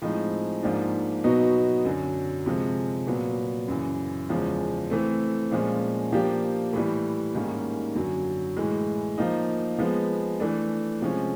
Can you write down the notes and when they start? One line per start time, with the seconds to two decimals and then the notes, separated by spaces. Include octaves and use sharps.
0.02 A2 F3 G#3 C4 D#4
0.63 G#2 F3 A#3 D4
1.24 B2 F#3 B3 D#4 F#4
1.85 F#2 D3 F#3
2.46 C3 F3 G#3
3.07 A#2 F#3 B3
3.68 F#2 C#3 E3
4.29 E2 C#3 F3 G#3
4.90 E3 A3 C4
5.51 A#2 F3 G#3 C#4
6.12 F3 A#3 D4 G4
6.73 A2 E3 G3
7.35 G#2 D#3 G3 A#3 C#4
7.95 F#2 D3 F#3
8.57 A2 E3 G#3
9.18 F3 A#3 D#4
9.78 F3 G#3 B3
10.40 E3 A3 D4
11.01 C3 F3 G#3 C#4